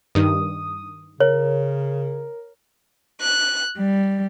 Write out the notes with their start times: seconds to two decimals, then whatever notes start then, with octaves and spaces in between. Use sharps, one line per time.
0.15 G2 D#3 D#6
1.20 C#3 A#4 C#5
3.21 F#6
3.78 G3